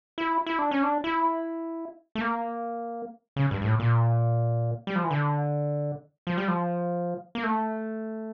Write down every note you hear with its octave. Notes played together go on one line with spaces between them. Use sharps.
E4
E4
D4
C#4
D4
E4
A3
A#3
C#3
G2
G2
A2
A#2
G3
F3
E3
D3
F3
G3
F3
A#3
A3